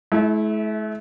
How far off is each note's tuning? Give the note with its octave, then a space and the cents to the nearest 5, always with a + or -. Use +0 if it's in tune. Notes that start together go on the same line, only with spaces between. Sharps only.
A3 -45 E4 -15